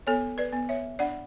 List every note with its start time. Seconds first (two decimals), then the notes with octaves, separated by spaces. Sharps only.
0.07 B3 A4 C#5
0.38 B4 D5
0.53 B3
0.69 C#5 E5
0.99 D4 D5 F#5